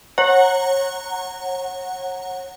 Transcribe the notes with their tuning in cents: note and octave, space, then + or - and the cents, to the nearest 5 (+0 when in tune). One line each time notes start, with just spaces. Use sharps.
C#5 -30 F#5 +0 A#5 -15